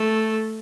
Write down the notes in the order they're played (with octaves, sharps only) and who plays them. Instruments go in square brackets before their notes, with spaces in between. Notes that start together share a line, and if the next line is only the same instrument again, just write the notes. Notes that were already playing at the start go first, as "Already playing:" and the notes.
Already playing: [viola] A3